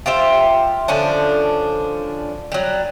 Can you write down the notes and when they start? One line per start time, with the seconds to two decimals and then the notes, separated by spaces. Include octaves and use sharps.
0.06 F4 G4 C5 E5
0.88 D3 F3 C#4 D4
2.52 F#3 G3